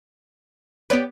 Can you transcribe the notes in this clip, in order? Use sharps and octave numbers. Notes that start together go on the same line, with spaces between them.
B3 G4 B4 C#5 D5